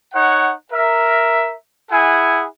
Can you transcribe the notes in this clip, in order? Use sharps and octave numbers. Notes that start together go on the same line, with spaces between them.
D#4 C#5 F#5
A#4 E5
E4 G#4 F#5 G#5